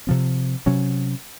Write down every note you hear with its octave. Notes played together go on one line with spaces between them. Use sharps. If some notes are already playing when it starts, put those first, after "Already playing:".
C3 F3 C4
C3 F#3 C#4